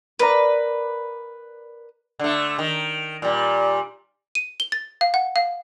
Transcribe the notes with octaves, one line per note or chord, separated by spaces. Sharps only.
A#4 B4 D5 A#5
D3 A3
D#3
A#2 G3
D#7
G7
A6
F5
F#5
F5